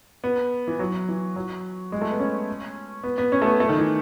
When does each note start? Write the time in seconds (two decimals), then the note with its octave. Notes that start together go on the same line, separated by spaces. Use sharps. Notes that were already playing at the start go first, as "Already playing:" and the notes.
0.24 B3
0.68 E3
0.79 F#3
1.09 E3
1.36 F#3
1.92 G#3
2.01 A3
2.11 B3
2.20 C#4
3.04 B3
3.18 B3
3.32 C#4
3.42 A3
3.46 B3
3.60 A3
3.69 D#3
3.79 E3